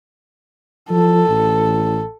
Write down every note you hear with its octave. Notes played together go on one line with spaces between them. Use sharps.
F3 A4
A1